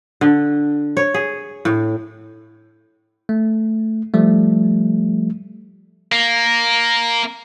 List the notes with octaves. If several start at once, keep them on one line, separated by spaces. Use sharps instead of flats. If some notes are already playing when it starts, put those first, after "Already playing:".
D3
C#5
G#4
A2
A3
F3 G3 A3
A#3